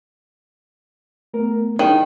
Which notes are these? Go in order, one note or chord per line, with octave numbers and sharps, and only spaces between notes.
A3 B3 A#4
D#3 E4 G#4